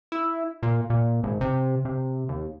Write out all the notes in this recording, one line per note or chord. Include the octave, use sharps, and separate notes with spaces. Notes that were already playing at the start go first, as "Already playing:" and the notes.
E4
A#2
A#2
G#1
C3
C3
D#2